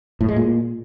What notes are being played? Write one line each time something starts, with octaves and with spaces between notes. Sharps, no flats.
A2
G#3
A#2